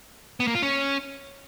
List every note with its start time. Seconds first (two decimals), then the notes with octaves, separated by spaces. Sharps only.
0.40 B3
0.47 A#3
0.55 F4
0.62 C#4